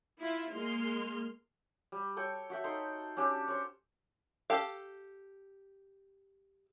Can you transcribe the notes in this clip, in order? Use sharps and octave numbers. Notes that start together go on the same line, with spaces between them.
E4 F4
G#3 A#3 C6 F6
G3
A4 C#5 G5
F#4 E5 G5
D#4 A4 C6
C#4 D4 G4 E6
C5 C#5
G4 A4 F5